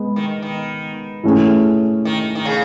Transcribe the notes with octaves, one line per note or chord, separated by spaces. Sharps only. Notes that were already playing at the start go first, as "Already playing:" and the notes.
Already playing: G#3 B3
D#3
D#3
E3 A3 C#4 G#4
D#3
D#3
C#3